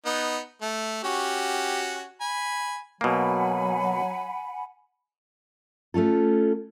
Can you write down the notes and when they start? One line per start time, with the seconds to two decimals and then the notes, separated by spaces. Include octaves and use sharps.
0.06 B3 D#4
0.62 A3
1.04 C#4 F#4 G4
2.21 G#5 B5
3.01 B2 F#3 A#3 F#5 G#5 B5
5.94 A3 C#4 F4 A4